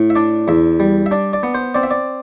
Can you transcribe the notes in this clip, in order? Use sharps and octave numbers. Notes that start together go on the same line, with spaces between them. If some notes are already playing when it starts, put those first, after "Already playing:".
Already playing: A2
E5
D4 D5
E2 E5
G3
E5
D4 D5
D5
B3
C5
C4 D5
E5
D5